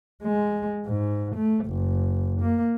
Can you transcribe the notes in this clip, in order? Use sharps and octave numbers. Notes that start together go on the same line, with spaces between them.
G#3
G#2
A3
F#1
A#3